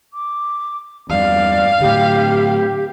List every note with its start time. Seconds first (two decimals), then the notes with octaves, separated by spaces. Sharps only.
0.13 D6
1.09 E2 G2 D5 F5
1.80 A2 D3 G4